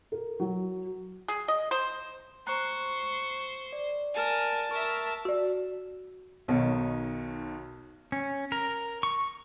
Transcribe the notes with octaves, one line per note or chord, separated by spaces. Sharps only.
A#4
F#3
G#4
D#5
C5
C5 A#5 C#6 F#6
D5
A#4 G#5 A5
A#4 E5 C#6
F#4 D5
B1 B2 D#3 D#4 C#5
C#4
A#4
C#6